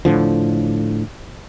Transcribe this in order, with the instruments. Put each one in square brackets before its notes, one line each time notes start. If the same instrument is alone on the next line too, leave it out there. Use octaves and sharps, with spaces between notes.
[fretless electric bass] A2 D3 F3